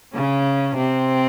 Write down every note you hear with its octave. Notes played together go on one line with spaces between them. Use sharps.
C#3 C#4
C3 C4